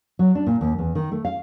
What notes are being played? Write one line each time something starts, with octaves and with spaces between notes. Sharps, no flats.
F#3
D4
A#2
D#2
E2
D#3
A3
F5